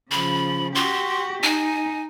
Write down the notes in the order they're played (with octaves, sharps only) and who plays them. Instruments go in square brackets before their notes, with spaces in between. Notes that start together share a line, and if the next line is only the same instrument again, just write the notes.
[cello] C#3 F3 [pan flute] B5
[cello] F#4 G4 [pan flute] C6
[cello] D#4 [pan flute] G#5